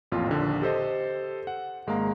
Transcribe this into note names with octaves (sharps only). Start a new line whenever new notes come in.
A1 F2 A#2 F4
A#1 D#2 D3
G4 A4 C5 D#5
F#5
G#1 G#3 A#3 F5 A#5